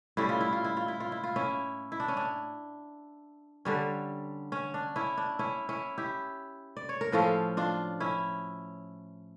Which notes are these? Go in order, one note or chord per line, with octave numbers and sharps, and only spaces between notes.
A2 G3 C#4 E4
F4
E4
F4
E4
F4
E4
F4
E4
F4
C#4 E4
E4
D4
C#4
D4
D3 G3 C#4
C#4
D4
C#4 E4
D4
C#4 E4
C#4 E4
E4 G4
D5
C#5
A#4
A2 F3 C#4 F4 A4
D4 F4
C#4 E4